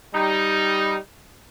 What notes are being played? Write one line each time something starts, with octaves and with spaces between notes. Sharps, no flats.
G3 D#4